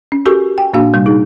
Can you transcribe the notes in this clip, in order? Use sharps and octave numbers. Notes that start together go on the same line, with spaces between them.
C#4
F#4 G4 A4 A#4 G#5 C#6
G5 G#5
A#2 A#3 D4 F#4 F5
C3 G3
D#4 G#4